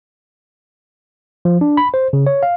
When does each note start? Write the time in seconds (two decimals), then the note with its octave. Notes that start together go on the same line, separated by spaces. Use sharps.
1.45 F3
1.61 D4
1.77 B5
1.94 C5
2.13 C#3
2.27 C#5
2.43 F5